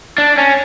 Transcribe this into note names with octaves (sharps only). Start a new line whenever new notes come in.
D4
C#4